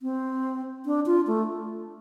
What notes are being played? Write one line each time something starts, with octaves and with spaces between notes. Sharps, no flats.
C4
D4
F4
A3